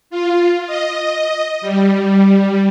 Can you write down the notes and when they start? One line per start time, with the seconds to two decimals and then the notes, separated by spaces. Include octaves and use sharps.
0.10 F4
0.67 D#5
1.61 G3